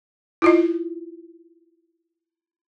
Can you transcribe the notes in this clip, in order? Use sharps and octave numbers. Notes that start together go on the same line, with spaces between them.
E4 F4 D#5